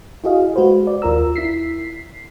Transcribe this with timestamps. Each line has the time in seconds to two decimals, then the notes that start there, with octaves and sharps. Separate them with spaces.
0.24 E4 F#4 G#4 D#5 F5
0.56 G#3 F#4 B4 C5
0.87 D5
1.02 D#2 F4 A#4 A#5 E6
1.36 E4 B6 C7